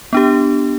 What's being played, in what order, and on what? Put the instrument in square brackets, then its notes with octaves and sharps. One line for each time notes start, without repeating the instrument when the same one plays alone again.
[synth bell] B3 D4 G4